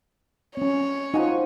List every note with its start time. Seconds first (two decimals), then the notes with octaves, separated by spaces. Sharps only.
0.57 C4 C#4 C#5
1.14 F3 D#4 F#4 G#5